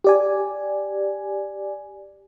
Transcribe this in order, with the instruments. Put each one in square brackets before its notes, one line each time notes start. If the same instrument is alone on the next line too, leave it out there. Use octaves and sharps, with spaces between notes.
[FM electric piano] G4 D5 G#5